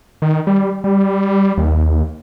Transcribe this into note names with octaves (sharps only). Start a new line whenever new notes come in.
D#3
G3
G3
D#2